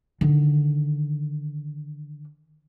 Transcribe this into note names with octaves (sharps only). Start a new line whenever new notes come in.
D3 D#3